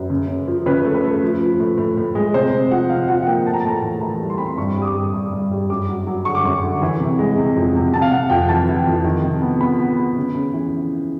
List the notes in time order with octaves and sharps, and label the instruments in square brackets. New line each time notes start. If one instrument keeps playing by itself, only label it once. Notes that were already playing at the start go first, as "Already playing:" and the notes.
Already playing: [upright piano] F#2 B4
C#3
C#3
F3
C#3 B4
A3
B4
A3
F3
F3
A2
A2
A2
G#3
C3 C5
C3
F3 F#5
C3 F5
F3 F#5
F#5
A#3 G5
A2 A5
A#5
A5
A2 A#5
A5
E3
E3 A#5
G3
C6
C4 B5
C6
G2 C#6
G3
D#6
D6
G2
G2
G2
G3
F#2 D6
F#3
F#3
D3 C#6
D6
F#2 C#6
D3
E3
C3
G#3
C3
F2
C3
C3 A5
F5
C3 F#5
F2 G5
E3 A5
E3
F2
D#3
C3
B3
B3 B5
B3
B3
C#3
C#3
E3